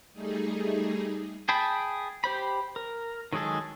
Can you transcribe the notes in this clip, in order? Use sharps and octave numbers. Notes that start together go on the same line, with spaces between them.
G3 A3 D#4 G#4
G#4 G5 A5 B5
G4 C5 B5
A#4
D#3 F#3 G#3 G#4 A4